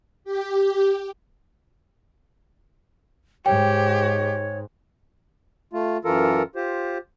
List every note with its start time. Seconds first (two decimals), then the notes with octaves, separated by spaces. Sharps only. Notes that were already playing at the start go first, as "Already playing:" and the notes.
0.24 G4
3.46 G#2 G4 C#5 G5
5.73 A3 F4
6.05 F#2 E3 F4 A4 A#4
6.56 F4 G4 C5